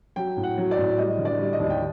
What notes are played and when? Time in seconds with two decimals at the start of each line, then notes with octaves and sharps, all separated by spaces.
0.16 F#3 G5
0.37 A2
0.43 F#5
0.58 F#3
0.71 D5
0.78 A2
0.98 G3 D#5
1.19 D3
1.25 D5
1.39 G3
1.53 D#5
1.60 D#2
1.70 G5